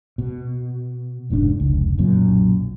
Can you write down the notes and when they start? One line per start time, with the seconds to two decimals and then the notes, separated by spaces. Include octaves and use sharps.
0.18 B2
1.30 F1 G#2 C4 D4
1.60 F1 C#2
1.98 B1 F#2 A#2